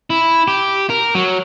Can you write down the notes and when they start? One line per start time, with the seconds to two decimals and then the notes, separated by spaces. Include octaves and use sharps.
0.10 E4
0.48 G4
0.90 A#4
1.15 F#3